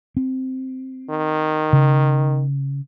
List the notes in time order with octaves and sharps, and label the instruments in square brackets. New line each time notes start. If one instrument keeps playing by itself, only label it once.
[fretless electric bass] C4
[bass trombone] D#3
[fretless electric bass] C#3